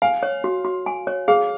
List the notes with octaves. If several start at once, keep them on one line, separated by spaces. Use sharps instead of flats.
F5 G#5
C#5
F#4
F#4
G#5
C#5
G#4 F5